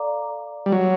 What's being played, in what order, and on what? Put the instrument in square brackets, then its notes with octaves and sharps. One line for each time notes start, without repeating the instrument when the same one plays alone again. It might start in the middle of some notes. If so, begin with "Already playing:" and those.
Already playing: [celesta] A4 D5 F5 A#5 D6
[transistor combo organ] G3
F#3